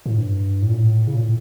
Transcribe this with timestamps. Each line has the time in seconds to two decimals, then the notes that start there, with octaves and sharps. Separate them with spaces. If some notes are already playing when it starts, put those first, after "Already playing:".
0.06 A2
0.18 G2
0.62 A2
0.69 A#2
0.76 A2
1.07 C#3
1.15 A#2
1.23 A2